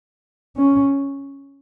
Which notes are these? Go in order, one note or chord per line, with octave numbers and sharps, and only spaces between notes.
C#4